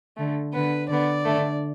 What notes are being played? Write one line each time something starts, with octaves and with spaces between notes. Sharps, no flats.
D3 A3
D3 B3 B4
D3 B3 D5
D3 A3